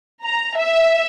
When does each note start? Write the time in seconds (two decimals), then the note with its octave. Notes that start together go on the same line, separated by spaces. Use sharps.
0.22 A#5
0.56 E5